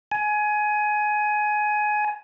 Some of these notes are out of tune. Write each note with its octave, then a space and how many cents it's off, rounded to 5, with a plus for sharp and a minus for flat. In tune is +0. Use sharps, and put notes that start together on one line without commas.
G#5 +20